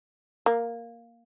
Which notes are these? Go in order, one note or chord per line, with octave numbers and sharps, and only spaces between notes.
A#3